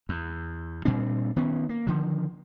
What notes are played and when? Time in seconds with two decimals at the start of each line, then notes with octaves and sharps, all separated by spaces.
0.09 E2
0.85 A#2 G3 C4 D4
1.36 D#3 B3 C#4
1.69 A#3
1.87 D3 D#3 F3